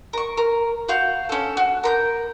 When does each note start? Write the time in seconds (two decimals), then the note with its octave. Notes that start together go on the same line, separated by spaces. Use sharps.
0.13 A#4 C#6
0.37 A#4
0.89 F#4 F5 G6
1.29 C#4 A4
1.57 F#4
1.84 A#4 B5 G6